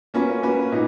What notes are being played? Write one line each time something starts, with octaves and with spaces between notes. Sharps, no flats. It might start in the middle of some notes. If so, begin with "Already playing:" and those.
A#3 C#4 F#4 B4
A#3 C#4 F#4 B4
A#2 D#4